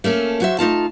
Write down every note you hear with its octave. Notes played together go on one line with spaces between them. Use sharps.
A3 A#3 C#4 A4
F#3 F#4 C5 E5
A3 D#4 F4 A5